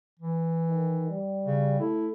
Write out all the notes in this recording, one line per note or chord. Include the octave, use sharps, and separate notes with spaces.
E3
D#3
G3
C#3
A3 E4